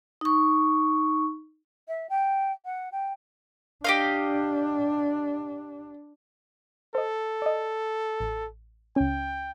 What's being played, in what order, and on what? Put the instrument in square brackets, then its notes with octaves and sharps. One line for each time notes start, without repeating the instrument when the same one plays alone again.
[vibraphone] D#4 C#6
[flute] E5
G5
F#5
G5
[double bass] D4 [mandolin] G4 D#5 F5
[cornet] A4 [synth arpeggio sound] C5 D#5
[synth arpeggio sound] D5 D#5
A1
[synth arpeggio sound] C#2 C#4 [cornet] G5